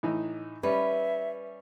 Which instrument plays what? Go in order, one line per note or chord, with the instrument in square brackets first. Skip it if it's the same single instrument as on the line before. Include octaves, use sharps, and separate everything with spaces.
[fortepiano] A2 E3 D#4
[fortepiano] G3 C#4 [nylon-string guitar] B4 [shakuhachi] E5